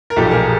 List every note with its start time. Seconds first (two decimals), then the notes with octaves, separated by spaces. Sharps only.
0.10 A#4
0.16 B1 A#2 F3 G4 A4
0.31 G#4 A#4